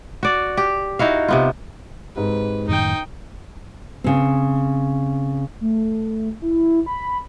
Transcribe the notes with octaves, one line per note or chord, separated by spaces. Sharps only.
F#4 D5
G4
D#4 E4 F#4 F5
C3 B3 F4
G#2 C4 G4 B4
F#2 A2 D#3 D#4 G5
C#3 C4
A3
E4
B5